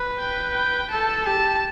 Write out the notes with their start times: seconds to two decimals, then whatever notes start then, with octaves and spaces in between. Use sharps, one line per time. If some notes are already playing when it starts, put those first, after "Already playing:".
Already playing: B4
0.19 G5
0.55 G5
0.91 A4 A5
1.26 G4 A5